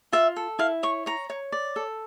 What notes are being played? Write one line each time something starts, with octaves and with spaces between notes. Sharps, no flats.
F4 E5
A4
E4 F5
C#5 C#6
C#5 A#5
C#5
D5
A4